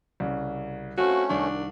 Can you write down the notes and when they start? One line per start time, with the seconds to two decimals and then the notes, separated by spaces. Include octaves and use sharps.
0.20 C2 C#3
0.98 A3 C4 C#4 F4 F#4
1.30 C2 D#3 D4 C#6